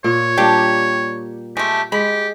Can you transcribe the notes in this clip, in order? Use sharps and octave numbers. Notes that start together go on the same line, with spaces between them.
A#2 C#5
G3 A#3 D4 G4
G#3 A3 G4
G#3 G4 B5